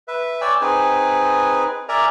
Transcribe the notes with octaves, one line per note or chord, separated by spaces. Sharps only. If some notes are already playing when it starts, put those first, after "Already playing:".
B4 E5
C#5 D5 G5 G#5 E6
C4 D#4 G#4 B4 G#5
A#4 D5 E5 G#5 A#5